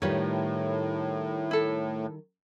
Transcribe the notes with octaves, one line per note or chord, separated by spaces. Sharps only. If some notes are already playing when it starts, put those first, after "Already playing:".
A2 D#3 G3 F4 B4 C#5
E4 A4